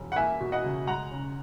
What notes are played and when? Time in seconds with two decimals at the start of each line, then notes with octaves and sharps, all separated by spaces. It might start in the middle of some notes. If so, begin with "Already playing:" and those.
Already playing: E1
0.12 F#5
0.16 A#3 E5 G#5
0.40 B2
0.52 D#5 F#5
0.64 C#2
0.87 G#3 F#5 A#5
1.11 C#3